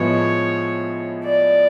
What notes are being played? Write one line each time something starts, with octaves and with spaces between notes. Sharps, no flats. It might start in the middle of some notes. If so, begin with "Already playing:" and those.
Already playing: A2 F3 G#3 B3 C#5
D5